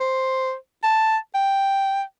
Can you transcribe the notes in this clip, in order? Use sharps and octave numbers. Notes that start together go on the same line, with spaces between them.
C5
A5
G5